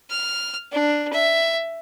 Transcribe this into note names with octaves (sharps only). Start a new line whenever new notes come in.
F6
D4
E5